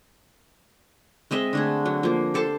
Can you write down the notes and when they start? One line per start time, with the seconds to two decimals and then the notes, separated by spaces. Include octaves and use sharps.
1.31 G#3 C4 D#5 E5
1.53 D3 A3 G#4
1.86 F#3
2.03 F3 A#3
2.34 G4 A4 C5 A5